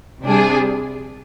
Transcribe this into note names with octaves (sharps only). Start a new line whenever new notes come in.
C3 G3 D4 G#4